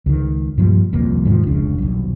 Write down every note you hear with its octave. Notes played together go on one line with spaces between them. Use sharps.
C#2 D#3
G2 A#2 F3 G3
D#1 C2 F2 A#3
D#2 G#2 D#3 F3
F1 C#2 C#3 D4
D#1 B1